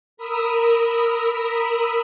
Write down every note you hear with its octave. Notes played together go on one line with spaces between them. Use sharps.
A#4 B5 D#6 E6